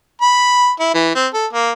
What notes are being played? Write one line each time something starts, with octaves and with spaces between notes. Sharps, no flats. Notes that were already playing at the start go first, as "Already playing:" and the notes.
B5
E4
E3
C4
A4
A#3